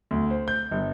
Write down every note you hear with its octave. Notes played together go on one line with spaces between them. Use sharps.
D2
C5
G6
G1